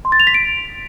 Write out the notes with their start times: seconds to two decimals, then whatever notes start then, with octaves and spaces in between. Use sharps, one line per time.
0.05 C6
0.12 A6
0.20 F7
0.27 B6
0.34 D7